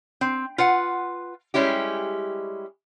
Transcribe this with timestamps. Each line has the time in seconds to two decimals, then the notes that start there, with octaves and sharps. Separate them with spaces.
0.21 C4
0.58 F4 B4 F#5
1.54 G3 G#3 C#4 E4 G4